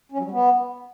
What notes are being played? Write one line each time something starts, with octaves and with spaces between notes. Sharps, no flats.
C#4
F#3
G3
B3